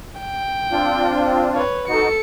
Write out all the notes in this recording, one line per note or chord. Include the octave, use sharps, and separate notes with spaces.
G5
C4 D4 F4
B4 C#5
D#4 F#4 A4 C#7